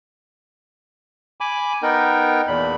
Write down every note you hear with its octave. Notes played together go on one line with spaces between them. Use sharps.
G#5 B5 D6
B3 D#4 A#4 G5
E2 A#2 B5